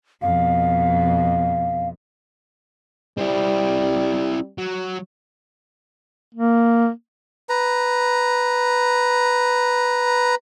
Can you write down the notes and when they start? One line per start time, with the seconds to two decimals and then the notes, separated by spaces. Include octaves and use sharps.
0.22 F2 B2 F5
3.18 G3 C4 E4
4.58 F#3
6.35 A#3
7.49 B4 A#5